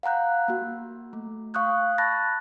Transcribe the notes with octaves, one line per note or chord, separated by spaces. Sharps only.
F5 F#5 A#5 F#6 G6
A#3 F#4
A3
F5 C#6 D#6 F#6 G6
A5 B5 F#6 G6 A6 A#6